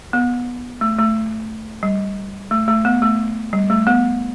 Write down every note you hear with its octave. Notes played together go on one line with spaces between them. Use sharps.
B3
A3
A3
G3
A3
A3
B3
A3
G3
A3
B3